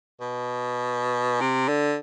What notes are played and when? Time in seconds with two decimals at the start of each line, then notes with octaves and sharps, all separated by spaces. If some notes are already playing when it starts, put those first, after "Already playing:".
0.21 B2
1.41 C3
1.68 D3